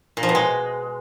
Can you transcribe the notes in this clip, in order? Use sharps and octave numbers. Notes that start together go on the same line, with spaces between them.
A#2
F3
B2
G#3